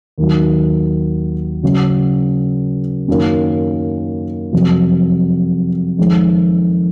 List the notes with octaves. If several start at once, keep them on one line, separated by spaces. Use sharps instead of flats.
D#2 D#3 F#3
C#3 F#3 C#4 F#4
F#2 D#3 F#3 A#3 C#4
F2 C3 F#3
F2 D#3 G#3